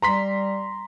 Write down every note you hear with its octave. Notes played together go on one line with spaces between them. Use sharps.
G3 A#5 C6 B6